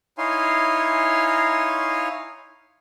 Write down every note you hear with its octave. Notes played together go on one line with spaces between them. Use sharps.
D#4 E4 C#5 F5 G#5 C6